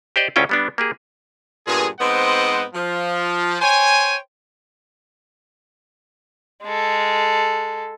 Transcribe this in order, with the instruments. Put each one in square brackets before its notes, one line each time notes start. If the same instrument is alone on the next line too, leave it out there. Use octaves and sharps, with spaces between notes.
[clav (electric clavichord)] G4 C5 D5 D#5
D2 C#3 C#4 E4 F4 G5
G3 B3 D4
A#3 G4 G#4
[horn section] G2 A#2 B3 G#4
G#2 B3 C4 C5 D#5 F#5
F3
C5 C#5 G5 G#5
[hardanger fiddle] G#3 A4